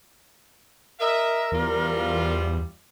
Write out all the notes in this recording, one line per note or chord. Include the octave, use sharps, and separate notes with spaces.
A#4 D#5 E5
E2 F3 G3 F4